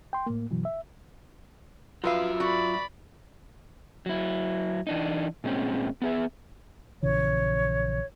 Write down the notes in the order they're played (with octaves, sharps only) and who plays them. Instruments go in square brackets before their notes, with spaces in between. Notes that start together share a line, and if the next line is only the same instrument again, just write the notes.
[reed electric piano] G5 C6
A2 A#3
F#2 B2 E3 F#3
E5
[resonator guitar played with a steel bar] F3 B4 F5 [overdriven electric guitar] F#3 E5 [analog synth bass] F4
[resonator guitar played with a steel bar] F#4 [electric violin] D5 B5
[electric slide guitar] F#3 E4
E3 D4 D#4
A#2 G#3 C4 C#4
B3 G#4 E5
[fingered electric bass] A#1 C#3 E3 [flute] C#5